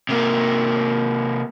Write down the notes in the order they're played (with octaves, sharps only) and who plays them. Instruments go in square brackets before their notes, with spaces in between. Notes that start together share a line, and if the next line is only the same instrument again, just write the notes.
[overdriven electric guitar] C3 A#3